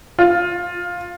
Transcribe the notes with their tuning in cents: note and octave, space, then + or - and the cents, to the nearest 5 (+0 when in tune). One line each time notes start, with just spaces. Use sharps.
F4 +15